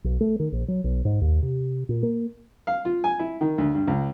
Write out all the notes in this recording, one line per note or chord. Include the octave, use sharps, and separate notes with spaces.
B1
A3
D#3
A#1
F#3
B1
G#2
D#2
C3
A#2
A#3
F5
F4
G#5
E4
D#3
D2
G2
C#2